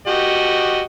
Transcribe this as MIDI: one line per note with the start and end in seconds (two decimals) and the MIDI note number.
0.07 0.81 66
0.07 0.81 67
0.07 0.81 75